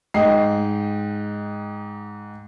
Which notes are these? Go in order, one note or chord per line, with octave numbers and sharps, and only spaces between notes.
G#2 D#5 G5 C7